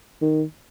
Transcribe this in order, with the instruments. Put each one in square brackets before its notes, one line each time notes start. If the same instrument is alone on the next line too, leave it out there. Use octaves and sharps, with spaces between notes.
[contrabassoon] D#3